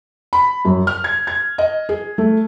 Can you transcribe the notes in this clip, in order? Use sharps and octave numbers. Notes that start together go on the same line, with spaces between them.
B5
F#2
F6
G#6
G#6
D#5
G#4
A3